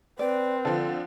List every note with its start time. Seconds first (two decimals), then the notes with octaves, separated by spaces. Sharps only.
0.19 C4 B4 D5
0.65 D3 F3 A4